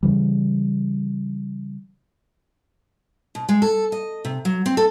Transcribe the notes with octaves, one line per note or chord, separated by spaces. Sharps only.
C#3 E3 G3
B2
G#3
A4
D#5
C3
F#3
C4
A4